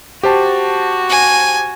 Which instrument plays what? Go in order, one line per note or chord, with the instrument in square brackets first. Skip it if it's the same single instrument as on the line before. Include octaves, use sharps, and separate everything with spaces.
[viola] F#4 [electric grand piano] G4 C5 A5
[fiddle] G#5